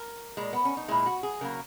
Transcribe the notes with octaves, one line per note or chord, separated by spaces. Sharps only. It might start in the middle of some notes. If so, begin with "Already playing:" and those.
Already playing: A#4
A#2 G#3
B3
C#4
D#4
A#2 G#3 E4
F#4
G#4
C#3 F#3 A#3 A#4